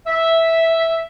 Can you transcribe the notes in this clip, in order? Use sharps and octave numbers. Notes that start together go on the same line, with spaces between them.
E5